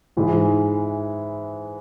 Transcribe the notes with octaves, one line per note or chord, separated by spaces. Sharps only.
G#2 E3 G#3